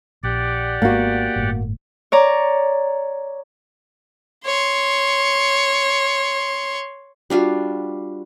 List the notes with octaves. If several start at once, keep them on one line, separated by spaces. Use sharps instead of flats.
A#1 G4 D5 F#5
G#1 G#3 A#3 B3 F#4
G1 A2
C#5 D5 A#5
C#5 C6
G3 D4 F4 F#4